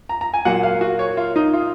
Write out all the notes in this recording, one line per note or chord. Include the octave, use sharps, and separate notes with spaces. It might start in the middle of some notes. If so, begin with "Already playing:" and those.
A#5
A#5
G#5
A#2 F#3 A#3 F#5
F5
F#4
C#5
F4
D#4
F4